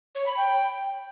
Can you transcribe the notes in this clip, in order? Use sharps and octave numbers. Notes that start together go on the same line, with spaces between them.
C#5
B5
G5